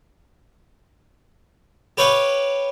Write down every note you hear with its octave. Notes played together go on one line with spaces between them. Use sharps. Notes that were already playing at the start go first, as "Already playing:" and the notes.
G4 B4 C#5 F5 G5